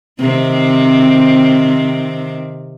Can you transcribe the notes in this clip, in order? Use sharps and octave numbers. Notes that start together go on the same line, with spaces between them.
C3 D#3 C4